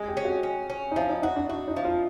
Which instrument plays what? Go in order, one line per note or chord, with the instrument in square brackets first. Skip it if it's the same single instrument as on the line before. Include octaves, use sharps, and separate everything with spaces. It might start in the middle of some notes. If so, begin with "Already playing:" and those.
Already playing: [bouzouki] G#3 [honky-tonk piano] G#4
[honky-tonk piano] G4
[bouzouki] C#4
[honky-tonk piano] F#4
[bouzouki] C#4
C#4
[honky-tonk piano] D#4
[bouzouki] F3 [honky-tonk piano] E4
[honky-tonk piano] D#4
[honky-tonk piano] D#4 [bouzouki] F#4
[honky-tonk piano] D4
[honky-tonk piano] E4 [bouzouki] F#4
[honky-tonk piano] D#4
[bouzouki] F3
[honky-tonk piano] F4